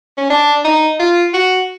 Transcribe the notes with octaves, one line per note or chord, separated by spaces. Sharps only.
C#4
D4
D#4
F4
F#4